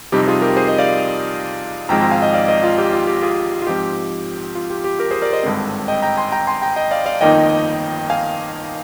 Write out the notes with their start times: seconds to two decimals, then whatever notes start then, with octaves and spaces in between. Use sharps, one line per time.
0.12 F2 C3 G3 C4 D#4 G4
0.28 F4 G#4
0.41 G4 A#4
0.57 G#4 C5
0.68 C5 D#5
0.78 D5 F5
1.89 G#1 G#2 F3 G#3 C4 G5 A#5
2.00 G5 A#5
2.11 F5 G#5
2.22 D#5 G5
2.33 D5 F5
2.48 C5 D#5
2.63 F4
2.78 G4
2.93 F4
3.07 G4
3.22 F4 G#4
3.62 F4
3.67 G#2 F3 C4 G4
4.55 F4
4.70 G4
4.84 G4
4.99 G4 A#4
5.11 G#4 C5
5.22 A#4 D5
5.33 C5 D#5
5.43 G#1 G2 D3 G#3 C4
5.88 D#5 G5
6.02 G5 A#5
6.17 G#5 C6
6.32 G5 A#5
6.47 G#5 C6
6.62 G5 A#5
6.76 D#5 G5
6.91 D5 F5
7.06 D5 F5
7.21 G1 F2 D#3 A#3 D#4 D#5 G5
8.10 F5 G#5